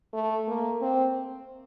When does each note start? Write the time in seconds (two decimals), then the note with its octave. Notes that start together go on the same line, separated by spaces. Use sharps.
0.13 A3
0.48 A#3
0.81 C4